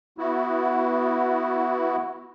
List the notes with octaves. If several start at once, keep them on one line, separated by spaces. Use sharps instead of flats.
B3 E4 F#4